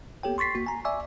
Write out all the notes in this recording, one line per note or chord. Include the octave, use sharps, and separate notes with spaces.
A#3 B3 G4 A4 C#5 G5
C6 C#6 A6 B6 C7
A#3 F#4
G#5 A#5
D5 E5 G#5 C#6 D6 E6